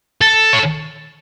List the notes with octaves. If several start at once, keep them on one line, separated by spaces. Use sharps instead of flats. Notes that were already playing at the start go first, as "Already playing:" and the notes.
A4
C#5